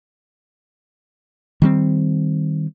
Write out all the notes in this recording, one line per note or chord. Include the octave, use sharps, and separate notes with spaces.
D#3 G3 C4